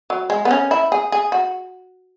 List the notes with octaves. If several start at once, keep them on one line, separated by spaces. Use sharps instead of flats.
F#3
G#3
B3
C#4
E4
G#4
G#4
F#4